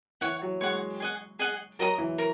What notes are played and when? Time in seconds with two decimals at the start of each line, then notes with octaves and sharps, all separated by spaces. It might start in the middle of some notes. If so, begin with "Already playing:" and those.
0.21 E3 C#5 F#5 C#6
0.42 F#3
0.61 G#3 C#5 F#5 C#6
1.00 G#4 D#5 F#5
1.39 G#4 D#5 F#5
1.79 F#3 A#4 D#5 A#5
1.98 E3
2.18 A#4